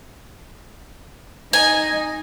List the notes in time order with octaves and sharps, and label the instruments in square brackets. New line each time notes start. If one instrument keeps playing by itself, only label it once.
[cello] D#4 D#5 [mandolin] G#5